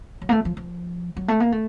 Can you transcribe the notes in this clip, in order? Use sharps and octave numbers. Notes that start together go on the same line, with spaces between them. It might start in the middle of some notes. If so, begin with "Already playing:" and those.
F#3
A#3
A3
F3
F3
F#3
A3
A#3
A3